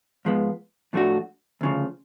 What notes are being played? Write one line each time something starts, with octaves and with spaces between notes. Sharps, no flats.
G#2 F3 G#3 B3
A2 F3 A3 D4 F#4
D2 C#3 F3